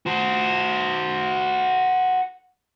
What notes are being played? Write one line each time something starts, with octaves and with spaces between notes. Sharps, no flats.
F#4 C5